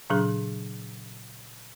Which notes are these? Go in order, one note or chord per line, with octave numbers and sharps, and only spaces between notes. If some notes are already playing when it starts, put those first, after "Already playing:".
A#2 C#3 F#3 D4 G#4